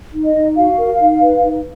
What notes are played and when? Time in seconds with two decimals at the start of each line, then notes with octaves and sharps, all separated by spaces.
0.13 D#4
0.24 D#5
0.35 D#4
0.56 F#4 F5
0.77 A#4
0.99 D#4
1.20 B4
1.42 D#4